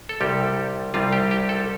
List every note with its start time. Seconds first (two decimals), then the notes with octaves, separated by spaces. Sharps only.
0.09 A4
0.20 C2 C3 G3 G4
0.94 C2 C3 G3 F4
1.12 G4
1.31 G4
1.49 A4